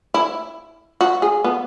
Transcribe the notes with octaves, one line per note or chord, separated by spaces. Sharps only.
E4
F#4
G#4
B3